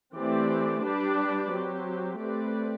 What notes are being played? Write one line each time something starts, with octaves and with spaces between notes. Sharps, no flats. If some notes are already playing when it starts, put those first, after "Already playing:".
E3 A3 C4 G4 D5
G3 D4 G4 B4 D5
F#3 C4 G4
A3 C4 G4 B4 D5